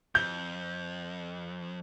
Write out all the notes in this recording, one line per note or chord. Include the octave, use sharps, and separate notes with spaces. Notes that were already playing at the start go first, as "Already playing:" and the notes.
F2 G6